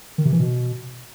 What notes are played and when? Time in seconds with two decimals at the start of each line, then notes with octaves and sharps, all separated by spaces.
0.18 D#3
0.25 C3
0.33 E3
0.40 B2